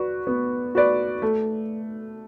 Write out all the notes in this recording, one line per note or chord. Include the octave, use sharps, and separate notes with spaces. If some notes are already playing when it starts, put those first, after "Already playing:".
Already playing: F#4 B4 D5
B3
F#4 B4 D5
A3